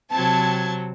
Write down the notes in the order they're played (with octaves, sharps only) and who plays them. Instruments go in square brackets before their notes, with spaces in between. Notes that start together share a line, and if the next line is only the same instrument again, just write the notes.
[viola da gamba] C3 F#3 C4 [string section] A5 G#6